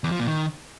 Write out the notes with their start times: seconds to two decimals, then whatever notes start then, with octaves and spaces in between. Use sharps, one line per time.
0.04 E2
0.12 F3
0.19 A#2
0.27 D#3